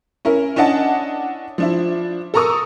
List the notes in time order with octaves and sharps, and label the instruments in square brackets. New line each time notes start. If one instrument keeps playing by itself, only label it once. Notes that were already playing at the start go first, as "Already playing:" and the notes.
[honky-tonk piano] C#4 E4 A#4
C#4 D4 E4 D#5 F#5 A5
F3 D4 E4
A4 A#4 A#5 C#6 D#6 E6